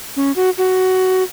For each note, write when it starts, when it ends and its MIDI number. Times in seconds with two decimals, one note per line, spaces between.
0.16 0.32 61
0.36 0.50 66
0.58 1.23 66